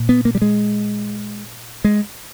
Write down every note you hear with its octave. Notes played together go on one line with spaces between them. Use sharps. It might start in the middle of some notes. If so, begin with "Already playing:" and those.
Already playing: A#2
B3
A#3
G3
G#3
G#3